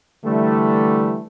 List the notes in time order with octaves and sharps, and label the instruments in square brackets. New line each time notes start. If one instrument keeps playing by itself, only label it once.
[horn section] D3 E3 G3 A3